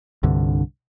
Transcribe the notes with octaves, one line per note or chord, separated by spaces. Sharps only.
C2 G2 D3